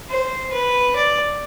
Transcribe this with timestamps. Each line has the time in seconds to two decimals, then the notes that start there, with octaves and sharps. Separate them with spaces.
0.10 C5
0.52 B4
0.96 D5